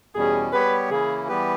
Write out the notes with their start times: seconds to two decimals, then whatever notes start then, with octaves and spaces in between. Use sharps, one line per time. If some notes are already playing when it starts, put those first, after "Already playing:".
0.15 E2 B2 G3 C#4 G#4
0.53 G3 B3 G4 B4 C#5
0.90 C#3 E3 A#3 C#4 E4 G#4
1.28 E3 G3 B3 G4 B4